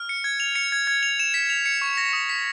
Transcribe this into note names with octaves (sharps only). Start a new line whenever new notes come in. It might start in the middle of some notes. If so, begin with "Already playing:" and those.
Already playing: F6
C#7
G#6
F7
C#7
G#6
G#6
F7
E7
B6
F7
C#7
C#6
A#6
D#6
B6